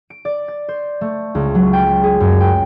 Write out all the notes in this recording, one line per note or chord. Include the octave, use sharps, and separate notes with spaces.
D7
D5
A6
C5
A3
C#2
F#3
G5
G#4
F#2
G5